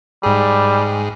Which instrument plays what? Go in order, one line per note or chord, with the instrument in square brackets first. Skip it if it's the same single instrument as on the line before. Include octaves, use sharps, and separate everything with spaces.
[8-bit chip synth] G#2 G#4 [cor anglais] G3